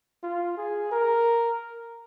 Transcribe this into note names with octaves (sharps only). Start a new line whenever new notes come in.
F4
G#4
A#4